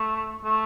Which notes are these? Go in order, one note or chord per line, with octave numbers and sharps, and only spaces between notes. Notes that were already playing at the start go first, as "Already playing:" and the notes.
Already playing: A3
A3